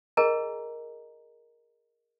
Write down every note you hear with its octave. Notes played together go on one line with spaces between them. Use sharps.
G#4 A#4 D#5 G#5 A#5